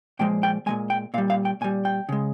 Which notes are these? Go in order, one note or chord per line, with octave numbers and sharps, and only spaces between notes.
A#2 F3 G#3 G5
G5
A#2 F3 G#3 G#5
G5
A#2 G3 F5
F5
G5
A#2 G3 G#5
G5
C#3 G#3